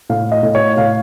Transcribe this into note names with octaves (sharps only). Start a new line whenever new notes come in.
A2 F5
D#5
A2
C#5
A2 F5